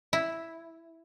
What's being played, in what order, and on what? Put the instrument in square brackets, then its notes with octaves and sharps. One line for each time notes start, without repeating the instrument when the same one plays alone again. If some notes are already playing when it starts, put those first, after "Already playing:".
[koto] E4